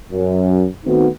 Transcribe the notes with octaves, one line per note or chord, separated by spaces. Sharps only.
F#2
D#3 A3 B3 C4 D#4 F#4